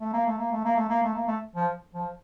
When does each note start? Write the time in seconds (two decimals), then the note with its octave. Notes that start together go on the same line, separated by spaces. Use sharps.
0.01 A3
0.13 A#3
0.26 A3
0.38 A#3
0.52 A3
0.64 A#3
0.76 A3
0.89 A#3
1.02 A3
1.15 A#3
1.27 A3
1.55 F3
1.94 F3